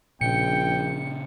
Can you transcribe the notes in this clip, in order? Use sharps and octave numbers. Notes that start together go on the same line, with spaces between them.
A#1 A#2 C#3 C#4 G5 C#7